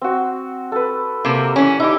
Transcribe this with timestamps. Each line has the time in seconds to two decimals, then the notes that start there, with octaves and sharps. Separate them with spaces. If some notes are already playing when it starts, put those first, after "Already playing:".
0.01 C4 F#4
0.72 A4 B4
1.25 C3 A#3 A#4
1.56 E3 C#4
1.80 D#4 E4 G4